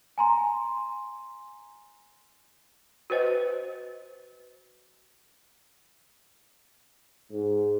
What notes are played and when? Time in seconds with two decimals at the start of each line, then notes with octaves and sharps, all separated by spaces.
0.18 G#5 A#5 C6
3.10 F#4 B4 C5 D#5
7.31 G#2